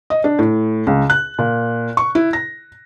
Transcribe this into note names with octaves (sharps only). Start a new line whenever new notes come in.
D#5
D4
A2
C#2
F#6
A#2
C#6
E4
A#6